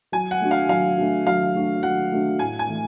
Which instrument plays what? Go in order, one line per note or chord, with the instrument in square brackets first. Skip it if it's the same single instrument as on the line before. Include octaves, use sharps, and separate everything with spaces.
[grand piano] F#3 [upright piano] G#5
[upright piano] F#5
[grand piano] A3 D4 F#4
[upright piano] F5
[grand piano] F#3 [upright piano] F5
[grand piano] A3 D4 F#4
[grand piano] F#3 [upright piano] F5
[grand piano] A3 D4 F#4
[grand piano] F#3 [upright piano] F#5
[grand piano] A3 D4 F#4
[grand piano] A2 [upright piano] G#5
[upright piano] G#5
[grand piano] E3 A3